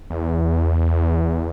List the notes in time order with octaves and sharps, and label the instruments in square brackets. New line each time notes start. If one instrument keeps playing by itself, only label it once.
[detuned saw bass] E2